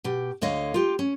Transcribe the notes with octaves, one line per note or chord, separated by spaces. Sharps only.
B2 G4
D2 D3 C#5 D#5 F5
F4 G4
C#4